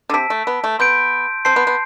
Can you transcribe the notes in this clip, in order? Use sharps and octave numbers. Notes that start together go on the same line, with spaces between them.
D3
C3 A5 E6 B6 D7
A3
B3
A3
B3 C6 G6 D7
C4 A5 C6 G6 C7
B3
B3